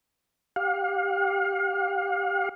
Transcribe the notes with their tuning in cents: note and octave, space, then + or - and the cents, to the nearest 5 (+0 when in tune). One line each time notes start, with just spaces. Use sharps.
G4 +0 F5 +40